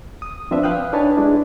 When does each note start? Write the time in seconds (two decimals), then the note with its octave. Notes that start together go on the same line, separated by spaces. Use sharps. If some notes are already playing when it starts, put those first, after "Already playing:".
0.22 D#6
0.51 F3 C4 D4 B4 E5
0.63 B4 F5 G5 D#6 F#6
0.93 D4 D#4 B4 C#5 G#5 A5
1.17 G#3 D4 E4